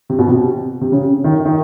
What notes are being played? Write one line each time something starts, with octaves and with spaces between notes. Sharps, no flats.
C3
B2
C3
C3
C#3
D#3
D#3